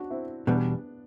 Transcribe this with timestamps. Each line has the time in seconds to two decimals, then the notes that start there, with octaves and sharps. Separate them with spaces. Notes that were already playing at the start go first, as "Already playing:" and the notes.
Already playing: D4 F#4
0.10 C4 E4
0.47 E2 B2 G3 B3 D4